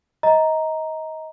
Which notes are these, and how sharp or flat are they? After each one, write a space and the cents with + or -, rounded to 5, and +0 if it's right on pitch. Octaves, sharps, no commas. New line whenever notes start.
D#5 +25 A#5 +0